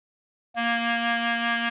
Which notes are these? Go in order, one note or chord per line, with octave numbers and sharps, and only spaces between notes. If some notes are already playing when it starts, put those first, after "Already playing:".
A#3